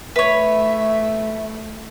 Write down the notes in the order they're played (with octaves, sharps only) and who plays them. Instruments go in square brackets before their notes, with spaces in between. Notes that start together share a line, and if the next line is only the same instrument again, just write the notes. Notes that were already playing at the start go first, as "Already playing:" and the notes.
[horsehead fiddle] A3 [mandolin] B4 C#5 [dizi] E5